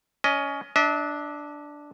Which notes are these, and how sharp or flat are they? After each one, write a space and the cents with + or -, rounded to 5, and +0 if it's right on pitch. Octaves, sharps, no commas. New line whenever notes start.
C#4 +20 D#5 +0
D4 +0 E5 -45